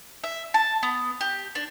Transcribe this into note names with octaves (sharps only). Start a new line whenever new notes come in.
E5
A5
B3
G4
D4